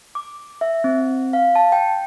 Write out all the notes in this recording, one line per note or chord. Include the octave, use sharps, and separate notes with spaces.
D6
E5
C4
F5
A5
G5